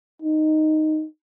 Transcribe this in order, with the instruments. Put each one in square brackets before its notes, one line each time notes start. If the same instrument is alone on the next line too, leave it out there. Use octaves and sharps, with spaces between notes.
[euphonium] D#4